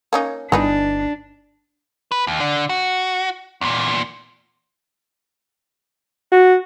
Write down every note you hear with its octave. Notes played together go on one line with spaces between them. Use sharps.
A#3 C#4 D#4
G1 E3 D4 D#4 B4
B4
D#2
D3
F#4
E2 A#2
F#4